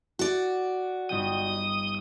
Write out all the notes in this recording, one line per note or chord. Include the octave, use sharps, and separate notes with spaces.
F#4 D5
G1 D#4 G5 D#6